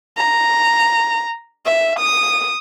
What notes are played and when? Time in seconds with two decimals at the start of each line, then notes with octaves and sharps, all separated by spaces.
0.18 A#5
1.66 E5
1.99 D#6